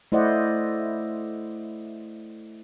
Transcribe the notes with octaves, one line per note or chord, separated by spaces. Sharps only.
A3 E4 C5 D5 D#5 F#5